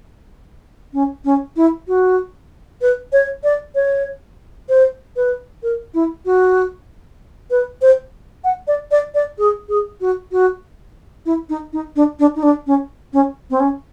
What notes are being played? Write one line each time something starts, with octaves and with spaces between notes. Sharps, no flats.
C#4
C#4
E4
F#4
B4
C#5
D5
C#5
C5
B4
A#4
E4
F#4
B4
C5
F#5
D5
D5
D5
G#4
G#4
F#4
F#4
E4
D#4
D#4
D4
D4
D#4
D4
C#4
C#4
C4
C#4